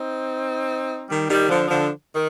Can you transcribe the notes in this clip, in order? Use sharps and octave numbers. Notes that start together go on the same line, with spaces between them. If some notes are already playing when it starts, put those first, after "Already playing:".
Already playing: C4 D#4
D#3 G3
D#3 G3
D3 F3
D3 F3
D#3